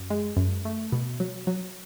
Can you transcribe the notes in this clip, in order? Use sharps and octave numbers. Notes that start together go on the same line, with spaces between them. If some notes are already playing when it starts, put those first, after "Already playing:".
Already playing: F#2
G#3
F#2
A3
B2
F#3
F#3